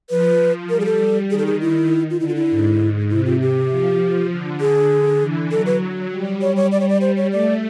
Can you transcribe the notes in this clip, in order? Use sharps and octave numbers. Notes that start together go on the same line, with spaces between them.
F3 B4
G3 A#4
G#4
A4
D#3 G#4
A4
G#4
E4
F4
D3 E4
F4
E4
G#2
C3 E4
F4
G4
F3
D3
G#4
D3
E3
F#3 A4
B4
G3
G3 C#5
C#5
D5
C#5
D5
C5
C#5
A3 D5